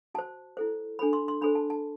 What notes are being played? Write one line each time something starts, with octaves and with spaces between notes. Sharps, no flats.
F#4 C5 A5
E4 A4 C5
D4 A4 C5 B5
C6
C6
D4 A4 C5 B5
A5
A5